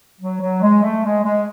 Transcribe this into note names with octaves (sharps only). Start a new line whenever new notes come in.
F#3
F#3
G#3
A3
G#3
G#3